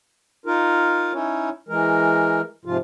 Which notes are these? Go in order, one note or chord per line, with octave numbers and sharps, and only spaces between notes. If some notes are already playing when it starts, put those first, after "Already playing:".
D#4 F4 A#4
C#4 D#4 E4 C#5
E3 G#3 A#4
G#2 C3 F3 F4